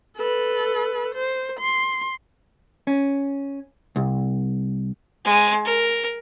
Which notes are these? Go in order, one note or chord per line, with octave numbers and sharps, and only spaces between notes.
A4 B4
C5
C6
C#4
C2
G#3
A#4